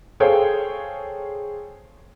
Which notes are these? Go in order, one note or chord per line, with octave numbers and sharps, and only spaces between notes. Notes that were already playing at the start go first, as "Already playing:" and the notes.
G#4 A4 C5 C#5 F5 G5